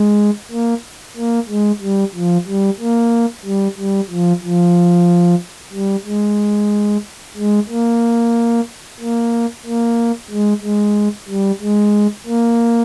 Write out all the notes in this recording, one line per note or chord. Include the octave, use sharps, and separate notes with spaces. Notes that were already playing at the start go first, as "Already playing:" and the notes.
Already playing: G#3
A#3
A#3
G#3
G3
F3
G3
A#3
G3
G3
F3
F3
G3
G#3
G#3
A#3
A#3
A#3
G#3
G#3
G3
G#3
A#3